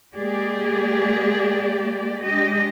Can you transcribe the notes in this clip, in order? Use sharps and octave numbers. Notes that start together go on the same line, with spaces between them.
G#3 A#3 G4 G#4 D5
G#3 D4 G4 D#5